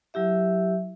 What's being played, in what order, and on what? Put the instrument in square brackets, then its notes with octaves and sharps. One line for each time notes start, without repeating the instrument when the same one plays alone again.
[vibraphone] F#3 E4 G4 E5